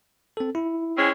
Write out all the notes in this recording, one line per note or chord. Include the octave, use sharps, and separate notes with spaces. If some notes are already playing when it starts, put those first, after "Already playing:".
C4 A4
E4
G#3 C4 C#4